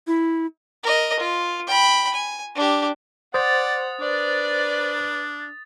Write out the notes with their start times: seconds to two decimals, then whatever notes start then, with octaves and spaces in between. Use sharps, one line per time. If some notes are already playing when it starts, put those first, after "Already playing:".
0.07 E4
0.83 A#4 D#5
1.19 F4
1.67 G5 B5
2.14 G#5
2.55 D4 G4
3.34 C5 D5 F#5 D#6 A6
4.01 D4 B4 D5